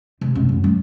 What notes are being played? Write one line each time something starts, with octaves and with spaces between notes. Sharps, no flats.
C3
F#2
F#2
F#3